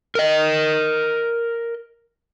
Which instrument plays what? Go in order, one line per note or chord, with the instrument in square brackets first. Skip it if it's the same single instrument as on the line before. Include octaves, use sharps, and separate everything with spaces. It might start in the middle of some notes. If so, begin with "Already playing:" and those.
[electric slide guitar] A#4 D#5